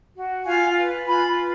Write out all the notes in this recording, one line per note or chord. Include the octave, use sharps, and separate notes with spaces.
F#4
F4 F5 G#5
B4
F4 G#5 B5
B4